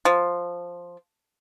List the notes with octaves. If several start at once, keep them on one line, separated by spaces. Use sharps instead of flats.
F3